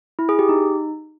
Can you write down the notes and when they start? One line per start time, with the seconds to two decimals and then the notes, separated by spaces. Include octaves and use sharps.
0.19 E4
0.29 G#4
0.39 G4
0.49 D#4